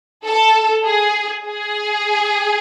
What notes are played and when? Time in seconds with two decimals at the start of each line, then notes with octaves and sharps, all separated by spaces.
0.25 A4
0.84 G#4
1.44 G#4